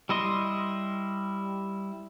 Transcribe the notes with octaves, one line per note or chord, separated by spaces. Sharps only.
G3 E4 D#5 C6